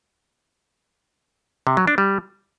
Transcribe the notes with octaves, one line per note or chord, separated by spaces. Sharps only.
C3
F#3
D4
G3